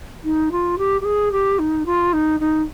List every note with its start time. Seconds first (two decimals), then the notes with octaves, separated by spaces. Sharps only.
0.24 D#4
0.51 F4
0.78 G4
1.01 G4
1.04 G#4
1.32 G4
1.59 D#4
1.85 F4
2.13 D#4
2.40 D#4